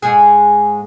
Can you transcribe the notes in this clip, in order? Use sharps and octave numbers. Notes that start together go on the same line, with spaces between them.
G#2 G#3 G#4